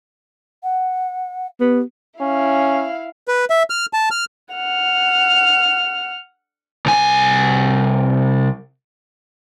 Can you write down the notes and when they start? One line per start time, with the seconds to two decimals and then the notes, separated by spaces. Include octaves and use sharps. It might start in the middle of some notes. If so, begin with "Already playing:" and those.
0.63 F#5
1.60 B3 G4
2.20 C#4 E4 F5
3.28 B4
3.50 E5
3.70 F6
3.93 A5
4.11 F6
4.54 F#5 F6
6.86 C2 G#5